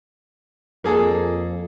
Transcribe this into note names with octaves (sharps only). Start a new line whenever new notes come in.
F2 A#3 G#4 A4